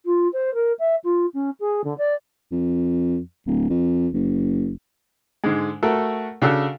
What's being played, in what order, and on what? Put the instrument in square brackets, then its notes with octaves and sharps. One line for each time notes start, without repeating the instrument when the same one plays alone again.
[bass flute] F4
C5
A#4
E5
F4
C#4
G#4
D3
D5
[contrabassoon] F2
D1
F2
F#1
[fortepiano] G#2 D3 G#3
A3 F#4 A4 A#4
C#3 D4 F#4 A4 F#5 E6